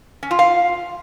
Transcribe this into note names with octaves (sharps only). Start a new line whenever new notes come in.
C#4
F4
F5